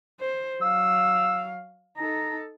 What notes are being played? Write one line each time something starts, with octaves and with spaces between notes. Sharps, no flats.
C5
F#3 F5 E6
D#4 A4 A#5